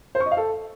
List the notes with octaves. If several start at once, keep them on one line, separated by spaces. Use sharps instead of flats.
C5
C#6
D#5
F5
A4